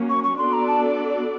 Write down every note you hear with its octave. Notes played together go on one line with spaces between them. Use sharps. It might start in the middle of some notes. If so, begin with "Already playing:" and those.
Already playing: F#3 A#3 C#4
C#6
C#6
B3 D4 F#4 A4 D5 C6
A#5
A5